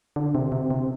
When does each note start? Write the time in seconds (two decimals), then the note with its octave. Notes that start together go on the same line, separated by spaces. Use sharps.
0.16 D3
0.35 C3
0.52 C3
0.71 C3